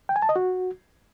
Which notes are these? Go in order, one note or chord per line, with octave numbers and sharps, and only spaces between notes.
G5
G#5
A5
D#5
F#4